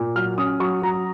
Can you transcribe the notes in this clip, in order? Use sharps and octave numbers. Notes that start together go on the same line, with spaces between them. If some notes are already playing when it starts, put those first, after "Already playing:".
Already playing: A#2
F#3 F6
C#4 D#6
F#3 C#6
F#3 A#5